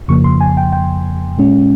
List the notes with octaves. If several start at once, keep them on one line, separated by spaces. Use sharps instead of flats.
F2 C#3 F3 A#3 C#6
C6
G#5
G5
G5
A#2 G#3 C#4